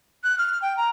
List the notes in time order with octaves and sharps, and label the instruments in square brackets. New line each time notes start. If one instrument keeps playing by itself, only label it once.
[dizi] F#6
F6
G5
A#5